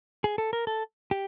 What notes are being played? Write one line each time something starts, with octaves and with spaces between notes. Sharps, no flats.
G#4
A4
A#4
A4
G4